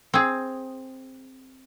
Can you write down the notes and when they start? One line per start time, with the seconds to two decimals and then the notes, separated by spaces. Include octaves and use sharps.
0.14 C4 G#4